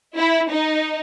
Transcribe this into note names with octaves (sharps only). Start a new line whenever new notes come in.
E4
D#4